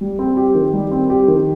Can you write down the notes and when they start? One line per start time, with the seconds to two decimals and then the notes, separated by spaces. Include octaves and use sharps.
0.01 G3
0.19 C4
0.37 G4
0.55 D#3
0.73 G3
0.91 C4
1.10 G4
1.28 D#3